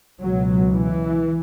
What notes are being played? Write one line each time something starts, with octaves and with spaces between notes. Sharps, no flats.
C#2 B2 F#3
E3